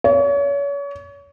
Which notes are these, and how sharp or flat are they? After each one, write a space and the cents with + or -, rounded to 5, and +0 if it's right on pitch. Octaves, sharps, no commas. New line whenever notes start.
C#5 +35